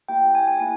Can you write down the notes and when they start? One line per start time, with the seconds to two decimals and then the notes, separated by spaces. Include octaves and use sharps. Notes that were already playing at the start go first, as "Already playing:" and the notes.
0.08 A#3 E4 G4 G5
0.35 G#5
0.47 G#5
0.60 A#3 E4 G#5